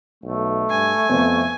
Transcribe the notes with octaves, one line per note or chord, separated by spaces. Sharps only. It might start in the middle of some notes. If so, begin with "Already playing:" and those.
B1 A3
G2 G#5
F2 B3 C4